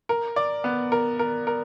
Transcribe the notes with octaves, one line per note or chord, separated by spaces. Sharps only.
A#4
D5
B3
A#4
A#4
A#4